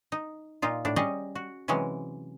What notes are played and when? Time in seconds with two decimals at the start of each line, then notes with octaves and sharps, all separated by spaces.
0.12 D#4
0.62 A#2 D#4 F4
0.85 A2 D4
0.96 G3 C#4 G#4 D#5
1.35 F#4
1.68 C3 E3 F#3 G#3 C#4